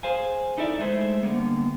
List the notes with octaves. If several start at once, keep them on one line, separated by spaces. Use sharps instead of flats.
G#4 C5 F5 G#5
D#4 E4 A4 D5 E5
G#3 A3 G#4 C5 E5
D3 G3 A#3 B3